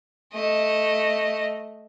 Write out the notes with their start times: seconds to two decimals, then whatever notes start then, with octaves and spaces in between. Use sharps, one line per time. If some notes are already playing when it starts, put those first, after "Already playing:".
0.33 A3 D#5